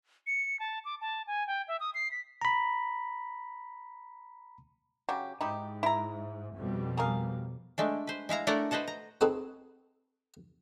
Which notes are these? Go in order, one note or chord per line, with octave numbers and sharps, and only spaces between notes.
C#7
A5
D6
A5
G#5
G5
E5
D#6
C7
B6
A#5 B5
C#3 F#3 G4
G#2 D#4 E4 G4
E4 A#5
F2 B2 G3
G#4 A#4 F5
G#3 A3 D4
B4 C5
G#3 E4 F5 A#5
A3 D4 A#4 D5 F#5 A#5
B4 C5 D#5 F#5 A5
A#5
C4 D#4 F#4 G#4 A4 B4